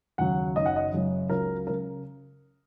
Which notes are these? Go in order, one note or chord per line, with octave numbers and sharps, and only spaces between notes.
D#2 C#3 F#3 F#5
F#1 F#2 D#3 D#5
F#5
D#5
F#1 F#2 C#3 F#3
C#2 C#3 F#3 A#4
C#3 F#3 A#4